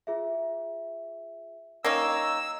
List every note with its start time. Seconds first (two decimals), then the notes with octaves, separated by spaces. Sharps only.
0.07 F4 G#4 E5
1.84 A#3 C#4 D#4 G5 C#6 E6 G#6